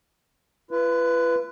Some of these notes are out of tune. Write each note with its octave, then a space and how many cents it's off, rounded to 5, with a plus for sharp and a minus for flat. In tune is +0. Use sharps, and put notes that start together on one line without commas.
F4 -45 B4 +0